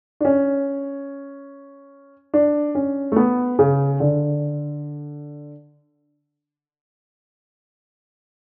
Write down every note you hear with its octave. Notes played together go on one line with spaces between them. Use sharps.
D4
C#4
D4
C#4
A3
B3
C#3
D3